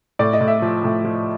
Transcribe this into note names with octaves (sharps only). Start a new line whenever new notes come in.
A2 D5
D#5
A2
E5
F3
A2
F3